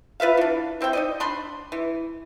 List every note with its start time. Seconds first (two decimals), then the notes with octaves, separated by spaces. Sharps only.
0.20 F4 B4 E5 F5
0.37 E3 D4
0.81 E3 C4 E5 G5
0.93 D#4 D5 D#5
1.20 D4 B5 C6
1.72 E3